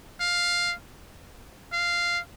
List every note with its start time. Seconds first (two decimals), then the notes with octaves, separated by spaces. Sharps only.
0.20 F5
1.73 F5